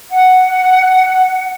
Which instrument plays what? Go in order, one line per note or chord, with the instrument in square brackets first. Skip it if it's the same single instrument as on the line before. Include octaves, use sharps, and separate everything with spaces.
[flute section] F#5